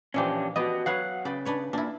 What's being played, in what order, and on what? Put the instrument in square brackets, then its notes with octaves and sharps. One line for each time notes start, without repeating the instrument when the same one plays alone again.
[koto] A#2 E3 F3 [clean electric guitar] C#4 D4 G4
[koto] B3 G4 [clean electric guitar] F#4 D#5
[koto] F#3 B4 C#5 [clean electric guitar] F5 F#5
[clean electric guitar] C#3 [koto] B4 D5 G5
[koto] D4 B4 C#5
[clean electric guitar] A#2 [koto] D4 E4